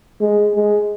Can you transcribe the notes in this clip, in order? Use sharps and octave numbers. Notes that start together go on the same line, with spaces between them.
G#3
G#3